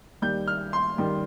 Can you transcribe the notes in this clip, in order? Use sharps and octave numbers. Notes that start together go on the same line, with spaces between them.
D#2 D#3 G3 G6
F6
C6
D#3 G3